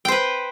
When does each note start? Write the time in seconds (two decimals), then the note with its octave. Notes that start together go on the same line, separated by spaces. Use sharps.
0.05 G5
0.08 C5
0.12 B4